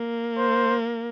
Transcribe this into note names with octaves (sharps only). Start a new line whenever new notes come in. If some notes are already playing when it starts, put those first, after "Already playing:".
Already playing: A#3
C5